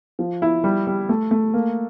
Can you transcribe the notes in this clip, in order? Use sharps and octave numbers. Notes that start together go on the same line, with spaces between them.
F3
E4
G3
G3
A3
A3
A#3